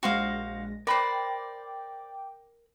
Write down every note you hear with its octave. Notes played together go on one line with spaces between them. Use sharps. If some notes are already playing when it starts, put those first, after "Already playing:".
A#1 G#3 F#4 C5 F5 A#6
A#4 C5 D5 G5 B5 D6